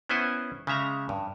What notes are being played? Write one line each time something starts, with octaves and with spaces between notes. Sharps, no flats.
B3 C#4 E4 C5 F#5 G#5
C#3 G#3 E5 A#5
G2